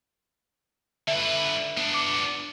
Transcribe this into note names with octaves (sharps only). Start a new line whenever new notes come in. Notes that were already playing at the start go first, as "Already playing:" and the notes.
D3 B4 E5
B3 D4
D6